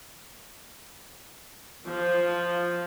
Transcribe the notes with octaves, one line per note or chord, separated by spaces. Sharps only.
F3